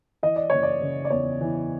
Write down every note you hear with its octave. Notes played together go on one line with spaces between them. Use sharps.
E3 D#5
D5
F#1 C#5
D5
C#3
D5
E2 C#5
E3